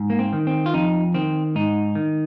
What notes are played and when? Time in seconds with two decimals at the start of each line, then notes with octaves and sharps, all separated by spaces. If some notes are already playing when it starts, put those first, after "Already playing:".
Already playing: G#2
0.10 A#3
0.19 C4
0.33 D#3
0.47 C4
0.66 F4
0.74 F2 D#4
1.14 D#3 C4
1.55 G#2 D#4
1.95 D#3